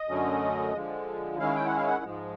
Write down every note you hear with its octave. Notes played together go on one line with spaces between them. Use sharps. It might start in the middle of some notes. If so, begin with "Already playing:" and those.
Already playing: D#5
F#2 D3 F#3 A3 C#4
D3 F3 G#3
D#3 G#3 C#4 E4 F5
G5
F#5
F5
F#5
G#2 F3 G#3